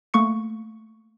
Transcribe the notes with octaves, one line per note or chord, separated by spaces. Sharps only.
A3 A#3 C#6 C#7